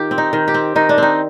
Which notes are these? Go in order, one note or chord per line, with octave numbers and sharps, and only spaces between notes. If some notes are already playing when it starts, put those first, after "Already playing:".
Already playing: D#3 F4 G4
C4
D#4
D#3
G4
C4
D#3 D#4
D4
C4 D#4